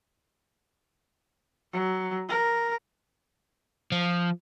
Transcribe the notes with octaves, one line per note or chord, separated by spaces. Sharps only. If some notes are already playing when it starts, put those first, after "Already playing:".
F#3
A#4
F3